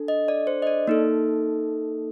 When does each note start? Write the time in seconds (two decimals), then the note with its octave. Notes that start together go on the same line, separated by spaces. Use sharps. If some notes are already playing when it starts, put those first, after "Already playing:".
Already playing: D4 A4
0.08 D#5
0.28 D5
0.47 C5
0.62 D#5
0.67 D5
0.87 A#3 D#4 A4